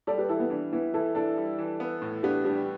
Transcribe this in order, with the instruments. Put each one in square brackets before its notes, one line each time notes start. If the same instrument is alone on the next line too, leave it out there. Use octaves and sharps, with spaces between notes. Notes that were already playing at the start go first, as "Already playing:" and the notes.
[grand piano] G3 [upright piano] A4 D5
[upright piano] G4 B4
[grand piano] E3 [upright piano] E4 A4
[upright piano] B3
[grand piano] E3 [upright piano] D4
[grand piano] E3 [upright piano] B3 E4
[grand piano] E3 [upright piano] E4 A4
[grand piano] D4 [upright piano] E4 A4
[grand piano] G3
E3
B3
A2
[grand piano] B3 [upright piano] D4 G4
[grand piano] G3 [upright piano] D4 G4